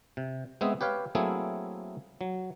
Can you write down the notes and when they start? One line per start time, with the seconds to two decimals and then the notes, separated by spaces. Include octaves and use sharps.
0.17 C3
0.61 G#3 B3 C4 G#4 E5
0.81 G4 B4 C#5 F5 G5
1.15 F#3 A3 A#3 C4 E4 G#4
2.21 F#3